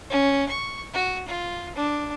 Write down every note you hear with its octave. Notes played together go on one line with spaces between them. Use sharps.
C#4
C#6
F#4
F4
D4